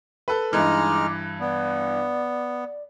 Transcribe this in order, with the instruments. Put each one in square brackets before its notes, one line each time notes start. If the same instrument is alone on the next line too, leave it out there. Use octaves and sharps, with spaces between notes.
[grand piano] A4 B4
[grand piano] G2 E3 [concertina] G#3 D#4 F6 [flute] D6
[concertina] B3 [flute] D5